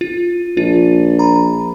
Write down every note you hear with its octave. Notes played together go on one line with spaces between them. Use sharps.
F4
A#1 F4
A#5 B5